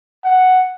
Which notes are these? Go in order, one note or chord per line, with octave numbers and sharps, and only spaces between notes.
F#5